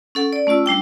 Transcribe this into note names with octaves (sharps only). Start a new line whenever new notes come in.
C#4 A4 F#5
D5
A3 C#4 F4 E6
G3 D4 G5